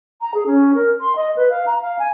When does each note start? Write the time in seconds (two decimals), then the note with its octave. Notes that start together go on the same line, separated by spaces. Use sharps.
0.21 A#5
0.34 G#4
0.46 C#4
0.74 A#4
1.01 C6
1.16 D#5
1.36 B4
1.50 F5
1.66 A#5
1.81 F5
1.99 G#5